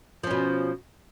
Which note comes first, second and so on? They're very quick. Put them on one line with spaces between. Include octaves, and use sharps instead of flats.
F3 C#4 B2